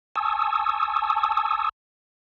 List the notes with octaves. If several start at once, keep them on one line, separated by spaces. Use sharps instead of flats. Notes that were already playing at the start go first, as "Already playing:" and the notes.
G#5 A5 C#6 D#6 E6